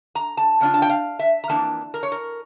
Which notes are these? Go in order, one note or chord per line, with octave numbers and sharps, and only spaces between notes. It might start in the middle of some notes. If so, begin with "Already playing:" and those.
A#5
A5
F2 C#3 D4 F4
A5
G5
F5
E5
A#5
F2 E3 A#3 D4 A5
A#4
C#5
A#4